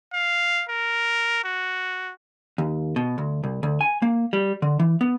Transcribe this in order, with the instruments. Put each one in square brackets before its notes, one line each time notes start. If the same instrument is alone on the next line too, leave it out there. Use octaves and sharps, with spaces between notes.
[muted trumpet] F5
A#4
F#4
[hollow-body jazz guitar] D#2
B2
D2
C2
D2
G#5
A#3
G3
D3
E3
B3